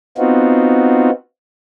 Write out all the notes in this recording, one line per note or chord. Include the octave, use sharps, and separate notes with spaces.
B3 C4 D#4 F4 F#4